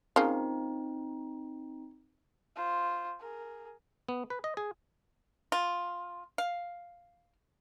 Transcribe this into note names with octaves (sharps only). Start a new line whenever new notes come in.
C#3 F3 A#3 C4 D#4
F4 C5
G#4 A#4
B3
B4
D#5
G#4
F4
F5